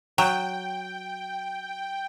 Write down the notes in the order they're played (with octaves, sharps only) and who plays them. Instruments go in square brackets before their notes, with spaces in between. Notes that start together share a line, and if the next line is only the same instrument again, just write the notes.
[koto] F#3 [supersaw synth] G5